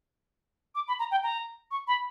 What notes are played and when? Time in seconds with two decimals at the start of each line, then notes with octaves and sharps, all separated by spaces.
0.75 D6
0.88 B5
0.99 A#5
1.11 G5
1.23 A#5
1.71 C#6
1.88 B5